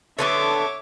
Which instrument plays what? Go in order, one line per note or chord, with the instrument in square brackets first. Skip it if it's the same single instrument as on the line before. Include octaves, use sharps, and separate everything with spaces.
[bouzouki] D3 B3 A4 [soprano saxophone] C#5 [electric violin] E5 D6